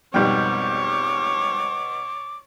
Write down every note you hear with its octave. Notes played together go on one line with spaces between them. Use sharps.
F2 G#2 B2 G3 C#5 G5 D6